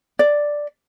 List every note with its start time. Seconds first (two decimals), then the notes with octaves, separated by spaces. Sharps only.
0.19 D5